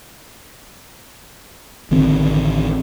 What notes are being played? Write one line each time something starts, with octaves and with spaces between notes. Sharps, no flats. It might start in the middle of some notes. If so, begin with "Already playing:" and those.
A1 D3 D#3 C4